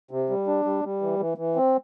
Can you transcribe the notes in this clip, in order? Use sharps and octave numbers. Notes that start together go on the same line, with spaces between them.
C3
G3
D4
G3
G3
E3
E3
E3
C4